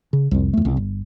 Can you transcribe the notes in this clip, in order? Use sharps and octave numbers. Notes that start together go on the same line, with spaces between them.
C#3
C2 F2
E2 A3
C2
G1